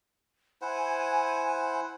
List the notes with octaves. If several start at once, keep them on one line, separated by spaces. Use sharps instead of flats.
E4 C5 F#5 G#5